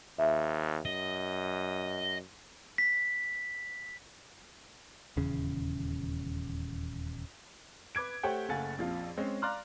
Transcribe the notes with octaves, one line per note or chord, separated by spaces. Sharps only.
D#2 E5
F#2 D#5
B6
D#1 E2 C#3
B4 D6 G#6 D7
A3 G4 C5 C#5 F#5 G5
F#1 A3 F5 F#5 G#5 A6
A#1 F2 F3 F4
G#3 C4 C#4
D5 F5 A#5 C6 F6 F#6